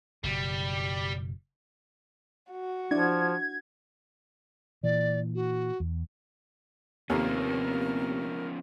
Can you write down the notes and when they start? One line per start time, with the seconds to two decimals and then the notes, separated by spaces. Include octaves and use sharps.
0.24 F#1 B2 G3
2.51 F#4
2.91 F3 D4 E4 D5 G#6
4.83 A#2 E3 D5
5.35 F#4
5.80 E2
7.10 D#2 C3 F3 A#3 B3 C#4 A#4